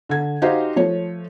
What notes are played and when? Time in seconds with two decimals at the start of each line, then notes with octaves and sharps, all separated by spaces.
0.09 D3 G#6
0.42 D#4 F#4 G4 C5 F5
0.76 F3 A3 C#5